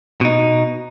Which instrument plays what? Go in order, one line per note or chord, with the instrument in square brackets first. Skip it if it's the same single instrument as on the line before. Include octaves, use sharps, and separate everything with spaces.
[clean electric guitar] B2 D#4